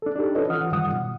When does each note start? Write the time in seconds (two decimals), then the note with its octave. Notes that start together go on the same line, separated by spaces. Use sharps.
0.02 D4 A4
0.16 D4 D#4 G4 A4
0.35 C#4 F4 A4 B4 C#5 D#5
0.50 E3 F4 F#5 D#6 F6
0.72 F#2 D#3 G3 F#5 D#6
0.92 B2